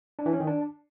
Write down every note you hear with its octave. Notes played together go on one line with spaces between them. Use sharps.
D4
E3
C#4
D#3
D4